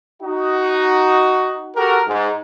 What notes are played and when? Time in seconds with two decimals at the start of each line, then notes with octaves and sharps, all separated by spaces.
0.22 D#4 F#4
1.75 F#4 G4 A4 A#4
2.07 G#2